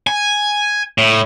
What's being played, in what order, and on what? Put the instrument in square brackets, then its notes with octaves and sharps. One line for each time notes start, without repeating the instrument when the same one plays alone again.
[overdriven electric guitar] G#5
A2